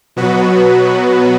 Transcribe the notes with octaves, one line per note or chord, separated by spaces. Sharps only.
B2 F#3 B3 F#4 B4